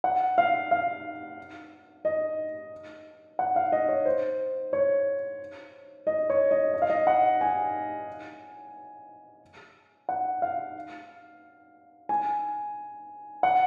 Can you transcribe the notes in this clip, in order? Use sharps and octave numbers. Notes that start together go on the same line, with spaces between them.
F#5
F5
F5
D#5
F#5
F5
D#5
C#5
C5
C#5
D#5
C#5
D#5
D#5
F5
D#5
F#5
G#5
F#5
F5
G#5
F#5